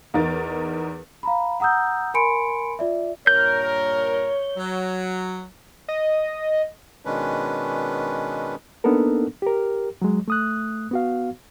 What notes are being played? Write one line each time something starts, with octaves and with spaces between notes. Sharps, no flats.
E2 D#4 A#4 A6
F5 A#5 B5
F#5 A#5 D#6 E6 G6
A#4 G#5 B5 C6 C#7 D7
F4 D5 E5
G2 A#2 A#4 C#5 G6
F#3
D#5
B2 D#3 G#3 C#4 D4 B4
A#3 B3 D4 D#4 A4 A#4
G4 A#4
F#3 G#3
A3 D#6 F#6
B3 F#4 F5